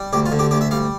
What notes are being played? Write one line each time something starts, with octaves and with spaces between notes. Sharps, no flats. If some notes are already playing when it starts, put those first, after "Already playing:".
Already playing: G3
D2 G4
F4
D3
G4
D2 G4
E5
G3 F5